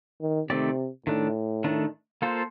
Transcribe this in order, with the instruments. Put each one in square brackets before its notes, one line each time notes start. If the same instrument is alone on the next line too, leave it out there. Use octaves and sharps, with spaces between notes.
[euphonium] D#3
[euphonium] C3 [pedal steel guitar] D#3 A3 C4 G4 D5
[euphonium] A2 [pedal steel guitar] D#3 A3 D4
[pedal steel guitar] D#3 A3 D4
A#3 F4 A4 C5